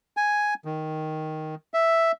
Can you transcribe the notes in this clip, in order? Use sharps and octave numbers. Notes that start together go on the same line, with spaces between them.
G#5
D#3
E5